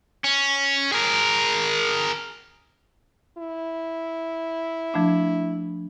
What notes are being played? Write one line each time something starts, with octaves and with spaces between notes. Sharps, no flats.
C#4
G#4 A#4
E4
F3 A3 D4